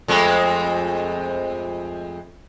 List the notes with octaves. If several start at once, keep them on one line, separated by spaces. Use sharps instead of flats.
F2 G#3 A3